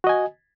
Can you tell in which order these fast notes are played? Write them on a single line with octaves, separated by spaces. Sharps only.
F#4 D#5 G#5